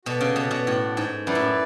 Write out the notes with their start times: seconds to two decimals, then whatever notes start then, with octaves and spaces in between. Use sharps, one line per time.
0.05 B2 F#4 A4 D5 F#5
0.21 C#3
0.36 B2
0.51 B2
0.67 A2
0.97 G#2
1.27 F#2 E4 B4 D5
1.35 A2